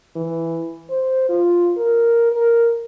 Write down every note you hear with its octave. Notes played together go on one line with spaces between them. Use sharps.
E3
C5
F4
A#4
A#4